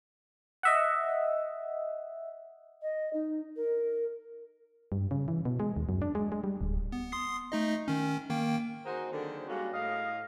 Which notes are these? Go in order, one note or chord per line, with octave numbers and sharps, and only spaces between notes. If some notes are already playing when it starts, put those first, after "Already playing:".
D#5 E5 F#5
D#5
D#4
A#4
G2
C#3
E3
B2
G#3
D#2
F#2
D4
G#3
G#3
G3
D1
B3
C6 D#6 C7
A3 D#4 D#5
D#3 C#4
D#3 A#3 G5
D#4 F#4 G#4 A#4 C5
D3 D#3 F#3 A#3 C4 G#4
G3 G#3 A#3 C#4 F#4
A2 D#5 F5